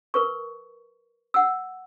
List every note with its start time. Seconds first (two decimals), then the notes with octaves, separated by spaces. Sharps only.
0.14 A#4 B4 C#6
1.34 F#5 E6